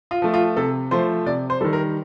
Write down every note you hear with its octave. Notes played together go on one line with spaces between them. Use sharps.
F4
F3 A3
F4
C3 A4
F3 A3 C5
C3 D5
C5
D#3 G3 A4
A#4